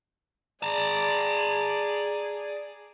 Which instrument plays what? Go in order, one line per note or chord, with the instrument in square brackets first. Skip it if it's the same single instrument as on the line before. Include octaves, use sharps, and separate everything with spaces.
[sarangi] G#4 [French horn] D5 [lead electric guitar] A5 A#5